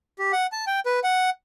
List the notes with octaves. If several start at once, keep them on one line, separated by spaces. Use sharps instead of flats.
G4
F#5
A5
G5
B4
F#5